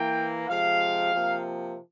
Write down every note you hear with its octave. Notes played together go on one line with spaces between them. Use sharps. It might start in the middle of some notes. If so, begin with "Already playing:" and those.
Already playing: E3 A#3 G5
C3 F3 G#3 F5
C3 F3 A#3